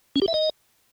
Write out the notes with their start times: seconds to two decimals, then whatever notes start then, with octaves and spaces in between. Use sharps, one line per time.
0.16 C#4
0.22 G4
0.28 E5
0.34 D#5